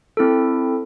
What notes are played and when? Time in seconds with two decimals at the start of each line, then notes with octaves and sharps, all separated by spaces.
0.17 C4 E4 A4